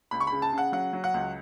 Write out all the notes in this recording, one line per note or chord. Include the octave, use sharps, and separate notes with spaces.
C#2 B5
C#6
C#3 B5
A5
C#3
F#5
F#3 F#5
F#3
F#5
C#2